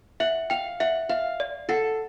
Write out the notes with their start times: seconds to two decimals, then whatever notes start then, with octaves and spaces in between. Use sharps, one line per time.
0.20 E5 F#5
0.50 F5 G5
0.80 E5 F#5
1.09 E5 F5
1.40 D5
1.69 A4 F#5